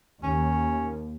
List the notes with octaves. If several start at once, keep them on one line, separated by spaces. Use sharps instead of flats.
D#2 C#4